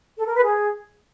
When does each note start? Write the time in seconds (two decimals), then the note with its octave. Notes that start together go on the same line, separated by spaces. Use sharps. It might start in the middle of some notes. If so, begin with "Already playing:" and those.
0.18 A4
0.26 A#4
0.35 B4
0.43 G#4